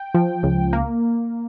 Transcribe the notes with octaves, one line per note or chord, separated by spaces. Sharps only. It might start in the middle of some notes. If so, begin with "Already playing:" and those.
Already playing: G5
F3
C#2
A#3